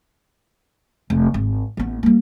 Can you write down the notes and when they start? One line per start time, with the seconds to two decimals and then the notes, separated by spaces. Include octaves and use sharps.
1.10 F1
1.34 G#1
1.77 A1 B3
2.03 G3 A#3